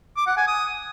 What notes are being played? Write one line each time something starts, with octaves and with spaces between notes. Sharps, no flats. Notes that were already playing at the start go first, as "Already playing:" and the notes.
D6
F#5
G#5
D#6